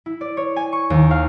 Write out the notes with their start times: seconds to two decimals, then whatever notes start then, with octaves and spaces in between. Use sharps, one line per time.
0.06 E4
0.21 D5
0.37 C#5
0.56 G#5
0.73 C#6
0.90 D#2
1.11 F5